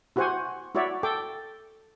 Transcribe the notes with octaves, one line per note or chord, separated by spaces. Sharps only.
E4 F#4 G4 C5 F#5 G#5
E4 F#4 C#5 D5 E5
A4 G5 D6